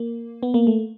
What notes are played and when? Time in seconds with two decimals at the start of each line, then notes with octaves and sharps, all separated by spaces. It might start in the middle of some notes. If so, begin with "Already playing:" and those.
Already playing: A#3
0.43 B3
0.54 A#3
0.67 A3